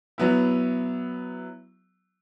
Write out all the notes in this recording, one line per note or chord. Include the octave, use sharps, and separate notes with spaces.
F#3 B3 E4